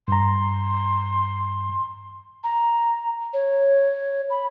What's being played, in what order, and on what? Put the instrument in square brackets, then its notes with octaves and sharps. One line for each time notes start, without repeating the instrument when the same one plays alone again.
[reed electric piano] G2 A#5 [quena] C6
[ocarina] A#5
C#5
B5